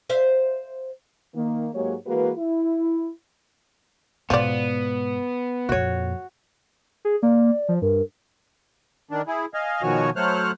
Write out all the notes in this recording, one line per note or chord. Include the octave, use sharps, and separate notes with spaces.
C5 E5 F5
D#3 A#3
G#2 F#3 G#3 A#3 G4 C#5
E3 G#3 A#3 F#4 B4
E4
G#2 B2 F3 B3 D5
F2 A#2 F#4 C#5
G#4
A#3 D5
F3
G2 A#4
D#3 D4
E4 G#4
D#5 F5 G#5
B2 D#3 F3 F#4 C#5 G#5
F#3 A3 C5 C#5 F6 F#6